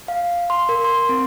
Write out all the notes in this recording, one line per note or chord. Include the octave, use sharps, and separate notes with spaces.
F5
C6
A#4
C6
C4